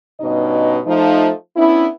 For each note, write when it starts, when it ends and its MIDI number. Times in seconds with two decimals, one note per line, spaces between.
0.20 0.80 43
0.20 0.80 47
0.20 0.80 61
0.20 0.80 63
0.20 0.80 75
0.86 1.30 53
0.86 1.30 57
0.86 1.30 63
1.56 1.87 59
1.56 1.87 61
1.56 1.87 62
1.56 1.87 64